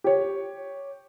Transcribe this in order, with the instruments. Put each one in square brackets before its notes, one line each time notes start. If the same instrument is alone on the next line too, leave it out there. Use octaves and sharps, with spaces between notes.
[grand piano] G4 C#5